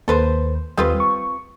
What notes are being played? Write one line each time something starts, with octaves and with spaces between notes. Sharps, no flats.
D#2 A#3 A4 B4 C5
D#2 G3 C4 F4 B4 D#6
C#6